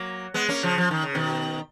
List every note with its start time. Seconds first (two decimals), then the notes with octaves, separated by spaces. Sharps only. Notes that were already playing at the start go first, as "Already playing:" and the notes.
Already playing: F#3 A#3
0.34 G#3 B3
0.49 A#3 C#4
0.63 C#3 F3
0.78 F3
0.91 D#3
1.03 C#3
1.15 B2 D#3